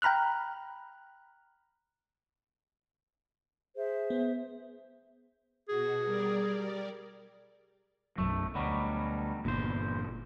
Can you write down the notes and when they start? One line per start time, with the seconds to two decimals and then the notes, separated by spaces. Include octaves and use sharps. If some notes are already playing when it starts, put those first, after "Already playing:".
0.02 G5 A#5 B5 F6 F#6
3.76 G#4 C5 E5
4.10 B3
5.69 B2 F#4 G#4
6.05 G3 A#4 D5
8.18 B1 F#2 F#3 A3
8.55 D2 B2 F#3 G3
9.45 G1 E2 A#2 C5